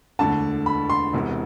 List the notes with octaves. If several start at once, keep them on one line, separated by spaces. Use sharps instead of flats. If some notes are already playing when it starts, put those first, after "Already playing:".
E1 D2 D3 A5
B5
C6
E1 E2 C3